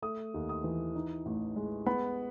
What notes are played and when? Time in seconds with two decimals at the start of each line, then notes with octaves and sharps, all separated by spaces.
0.02 A3 D#6
0.34 D#2
0.49 D#6
0.64 E3
0.95 D#4
1.26 A1
1.56 G#3
1.86 B3 B5